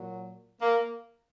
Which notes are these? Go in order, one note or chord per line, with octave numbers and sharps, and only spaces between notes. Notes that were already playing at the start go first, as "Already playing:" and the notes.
Already playing: A#2 F#3
A#3